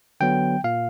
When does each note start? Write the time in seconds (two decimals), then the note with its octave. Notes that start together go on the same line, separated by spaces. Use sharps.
0.20 D3 F#3 B3 G5
0.64 A#2 F5